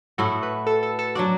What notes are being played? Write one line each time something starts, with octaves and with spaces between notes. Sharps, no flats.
A2 A3 E4 F#4
B4
A4
A4
A4
F#3 D4 F#4 D5